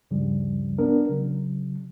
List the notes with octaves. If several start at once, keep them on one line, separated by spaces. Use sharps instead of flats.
D2 G2 C#3 F3 G3
B3 D4 A#4
C#3 F#3